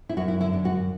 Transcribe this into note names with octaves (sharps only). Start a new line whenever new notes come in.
E4
F#2 F#4
E4
D3 F#3 E4
D4
F#2 F#4